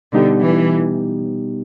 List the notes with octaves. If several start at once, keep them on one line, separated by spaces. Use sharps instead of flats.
B2 D3 G3 B3 D#4 G4
E3